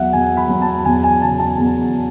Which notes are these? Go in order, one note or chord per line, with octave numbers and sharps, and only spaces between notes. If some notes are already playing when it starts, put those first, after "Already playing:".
Already playing: E2 F#3 E5 F#5
E2 G#5
B5
F#3
A5
E2 G#5
G#5
C#3 A5
A5
E2